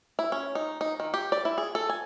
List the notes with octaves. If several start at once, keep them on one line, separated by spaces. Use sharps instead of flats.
E4
C#4
D#4
D#4
D#3
G4
D5
E4
G#4
A4
G#5